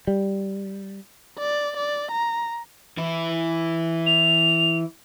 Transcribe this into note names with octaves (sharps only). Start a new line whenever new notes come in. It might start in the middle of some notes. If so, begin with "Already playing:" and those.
G3
D5
D5
A#5
E3 E4
F7